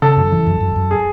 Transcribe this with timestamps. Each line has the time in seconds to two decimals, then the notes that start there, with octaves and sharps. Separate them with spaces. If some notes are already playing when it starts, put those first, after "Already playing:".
0.02 C#3 A4
0.17 F#2
0.32 E3
0.47 F#2
0.61 F#2
0.76 F#2
0.91 G#4